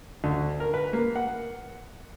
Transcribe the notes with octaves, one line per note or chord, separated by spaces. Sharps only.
D2
A#4
B4
A#3
F#5